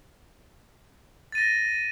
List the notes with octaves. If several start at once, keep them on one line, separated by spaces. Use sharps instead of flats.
A6 A#6 D#7